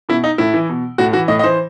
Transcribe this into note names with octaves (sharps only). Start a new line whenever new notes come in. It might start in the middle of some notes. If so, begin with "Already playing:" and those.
B2 E4
D#4
A2 E4
E3
B2
A2 F#4
E3 F#4
A2 D#5
D#5
E3 C5